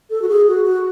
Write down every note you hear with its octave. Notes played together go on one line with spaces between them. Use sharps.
A4
F#4
G#4
F#4
F#4